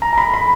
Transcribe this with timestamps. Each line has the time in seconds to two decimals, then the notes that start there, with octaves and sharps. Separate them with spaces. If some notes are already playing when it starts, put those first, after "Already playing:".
0.02 A#5
0.13 A#5
0.18 B5
0.34 B5